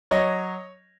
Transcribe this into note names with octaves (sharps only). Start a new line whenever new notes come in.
F#3 C#5 D#5